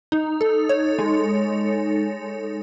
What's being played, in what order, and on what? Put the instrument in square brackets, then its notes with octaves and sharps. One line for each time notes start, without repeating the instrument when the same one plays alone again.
[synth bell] D#4
A4
C#5
G#3